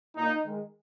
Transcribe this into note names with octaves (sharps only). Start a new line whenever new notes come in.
A#2 A#3 D#4
D#3 G#3